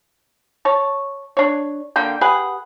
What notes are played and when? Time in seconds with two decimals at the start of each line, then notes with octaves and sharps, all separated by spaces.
0.65 C#5 A5
1.37 D4 C#5
1.96 D3 A#3 G5
2.21 G4 G#4 B4 F#5